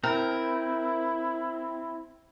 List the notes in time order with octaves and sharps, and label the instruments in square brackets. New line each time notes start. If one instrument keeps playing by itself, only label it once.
[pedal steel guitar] C4 [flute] E4 [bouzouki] A#4